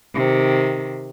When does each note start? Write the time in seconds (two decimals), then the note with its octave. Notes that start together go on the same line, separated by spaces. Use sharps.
0.15 C3 D#3